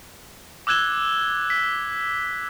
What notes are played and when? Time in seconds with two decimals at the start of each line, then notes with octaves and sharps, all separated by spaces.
0.67 D6 E6 F#6 G#6 E7 G7
1.50 B6